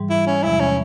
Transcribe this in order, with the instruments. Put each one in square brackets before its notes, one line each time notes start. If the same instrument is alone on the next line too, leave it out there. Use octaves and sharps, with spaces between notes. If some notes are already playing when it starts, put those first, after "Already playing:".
Already playing: [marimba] G#2 E3 G3
[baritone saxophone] E4
C#4
[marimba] E2 C3 F3 G#3 [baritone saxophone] E4
[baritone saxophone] C#4